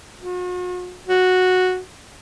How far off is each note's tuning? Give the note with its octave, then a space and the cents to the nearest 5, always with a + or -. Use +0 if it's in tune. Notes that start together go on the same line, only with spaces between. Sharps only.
F#4 -45
F#4 -5